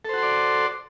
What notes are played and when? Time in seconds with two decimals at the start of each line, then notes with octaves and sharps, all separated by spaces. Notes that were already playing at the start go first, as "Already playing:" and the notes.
0.05 A4
0.09 C5
0.14 F#4
0.18 C6
0.23 D5